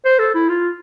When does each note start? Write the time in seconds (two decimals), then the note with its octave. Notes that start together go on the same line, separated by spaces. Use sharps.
0.05 C5
0.19 A4
0.35 E4
0.49 F4